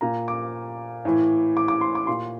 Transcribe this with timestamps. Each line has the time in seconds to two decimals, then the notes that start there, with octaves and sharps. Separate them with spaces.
0.01 A#2 A#5
0.28 D6
1.05 A2 E3
1.57 D6
1.68 D6
1.81 C6
1.95 D6
2.07 A#2 C6